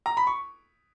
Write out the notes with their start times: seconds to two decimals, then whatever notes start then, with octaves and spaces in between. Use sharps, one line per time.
0.06 A#5
0.17 B5
0.27 C#6